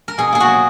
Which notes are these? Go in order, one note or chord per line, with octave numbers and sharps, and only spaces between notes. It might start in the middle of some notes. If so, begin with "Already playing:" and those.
A#4
B2 G#4
A#3 G#4
F#4
F#3